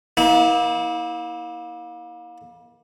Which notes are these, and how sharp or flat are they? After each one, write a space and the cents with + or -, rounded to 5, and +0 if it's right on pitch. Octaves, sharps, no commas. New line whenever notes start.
A#3 +30 E4 -35